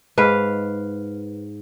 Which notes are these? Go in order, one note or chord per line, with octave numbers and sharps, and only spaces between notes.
G#2 B4 F5